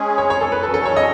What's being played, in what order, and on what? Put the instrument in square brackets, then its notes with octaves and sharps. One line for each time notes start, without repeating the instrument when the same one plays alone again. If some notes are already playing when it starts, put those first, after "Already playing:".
Already playing: [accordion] G#3 C#4 G#4
[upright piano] C#5
C#5
A4
B4
[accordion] E2 B2 F#3 C#4 [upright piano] A4
[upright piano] A4
C#5
D#5